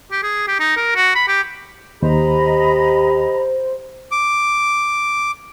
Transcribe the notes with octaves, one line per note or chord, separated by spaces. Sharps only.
G4
G#4
G4
D#4
A#4
F#4
B5
G4
D#2 G4 C5 D#5 A#5 B5
D6